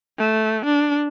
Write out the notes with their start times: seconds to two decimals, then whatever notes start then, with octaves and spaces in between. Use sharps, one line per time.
0.18 A3
0.65 D4